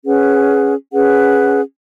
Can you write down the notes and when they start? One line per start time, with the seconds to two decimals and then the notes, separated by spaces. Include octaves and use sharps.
0.03 C#4 G#4 B4 F#5
0.91 C#4 G#4 B4 F#5